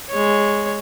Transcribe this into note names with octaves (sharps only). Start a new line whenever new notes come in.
G#3 C#5